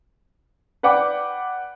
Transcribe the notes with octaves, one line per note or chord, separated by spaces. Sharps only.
B4 D5 F#5 G5 D6